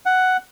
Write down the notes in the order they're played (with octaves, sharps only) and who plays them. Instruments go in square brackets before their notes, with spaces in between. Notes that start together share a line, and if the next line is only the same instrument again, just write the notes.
[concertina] F#5